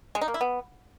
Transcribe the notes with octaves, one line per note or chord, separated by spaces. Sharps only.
G#3
D#4
A#3
E4
B3